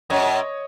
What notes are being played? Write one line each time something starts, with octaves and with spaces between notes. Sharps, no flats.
F#2 C#5 D#5